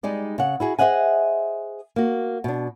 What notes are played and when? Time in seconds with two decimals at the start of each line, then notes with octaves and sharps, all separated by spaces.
0.03 G3 G#3 D#4 D5
0.38 C#3 F#5
0.60 E4 F#4 G#4
0.79 G#4 C5 D#5 E5 F#5 G#5
1.96 A#3 F#4
2.44 B2 D4